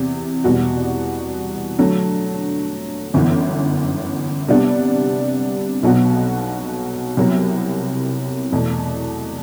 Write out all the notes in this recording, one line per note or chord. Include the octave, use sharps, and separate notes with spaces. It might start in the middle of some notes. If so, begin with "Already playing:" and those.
Already playing: E2 C3
E2 B2 G3 B3 F#4
D3 F#3 A3
G1 F#2 E3 B3
C3 G3 B3 D4
B1 B2 F#3 B3 F#4
C2 C3 F#3 B3
E2 B2 A3